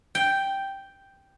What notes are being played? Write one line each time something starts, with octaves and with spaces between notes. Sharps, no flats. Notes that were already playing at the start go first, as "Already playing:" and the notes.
G5